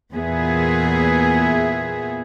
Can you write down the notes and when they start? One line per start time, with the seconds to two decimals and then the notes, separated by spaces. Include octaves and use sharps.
0.13 E2 A#2 B3 G#4 E5